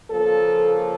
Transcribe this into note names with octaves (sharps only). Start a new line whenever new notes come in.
C#3 F3 A#3 A4